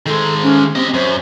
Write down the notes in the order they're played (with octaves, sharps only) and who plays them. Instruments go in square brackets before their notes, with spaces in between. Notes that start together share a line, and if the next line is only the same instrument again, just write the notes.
[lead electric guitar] D#3 G#3 [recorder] A4
[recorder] C#4
[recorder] C4 [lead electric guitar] G4 D#5
[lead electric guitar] F#2 [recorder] C5